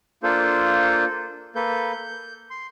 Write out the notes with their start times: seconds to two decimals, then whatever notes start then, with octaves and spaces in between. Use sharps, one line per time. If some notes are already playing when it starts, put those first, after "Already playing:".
0.23 A#3 D4 F4 A4 C5
1.55 A#3 A4 B4 G6
1.93 G6
2.50 C6